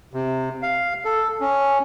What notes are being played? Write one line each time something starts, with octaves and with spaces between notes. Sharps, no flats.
C3
F5
A4
C#4